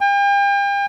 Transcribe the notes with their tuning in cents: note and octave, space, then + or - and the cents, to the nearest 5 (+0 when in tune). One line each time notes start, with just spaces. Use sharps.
G5 +40